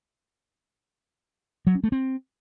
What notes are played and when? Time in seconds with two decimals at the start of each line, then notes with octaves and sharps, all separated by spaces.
1.67 F#3
1.75 C#4
1.84 A3
1.92 C4